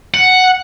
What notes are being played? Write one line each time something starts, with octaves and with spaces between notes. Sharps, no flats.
F#5